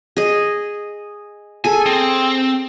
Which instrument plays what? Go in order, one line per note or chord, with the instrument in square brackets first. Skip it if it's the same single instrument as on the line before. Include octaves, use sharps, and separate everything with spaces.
[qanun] G#4 D#5
[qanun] G#4 A4 [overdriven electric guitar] G#5
[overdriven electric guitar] C4